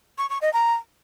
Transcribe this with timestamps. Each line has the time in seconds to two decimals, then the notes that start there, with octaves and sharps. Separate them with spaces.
0.18 C#6
0.30 C#6
0.42 D#5
0.53 A#5